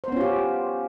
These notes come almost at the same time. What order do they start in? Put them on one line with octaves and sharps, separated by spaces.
C5 B3 C#4 F4 G4